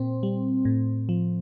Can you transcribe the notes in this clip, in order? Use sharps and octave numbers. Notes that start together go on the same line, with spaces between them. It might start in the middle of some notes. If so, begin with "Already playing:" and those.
Already playing: A#2 C4
G3
A2
F3